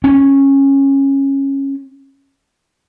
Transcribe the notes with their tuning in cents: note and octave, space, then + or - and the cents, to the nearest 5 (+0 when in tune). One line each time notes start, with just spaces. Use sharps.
C#4 -15